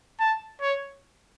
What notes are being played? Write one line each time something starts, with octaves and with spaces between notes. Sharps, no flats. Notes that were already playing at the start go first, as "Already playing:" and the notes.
A5
C#5